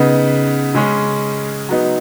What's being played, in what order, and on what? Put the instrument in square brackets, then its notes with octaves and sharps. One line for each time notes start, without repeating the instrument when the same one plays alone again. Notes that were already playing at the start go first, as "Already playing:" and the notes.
Already playing: [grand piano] C#3 B3 D#4
C#3 G#3 C#4
F#3 B3 D#4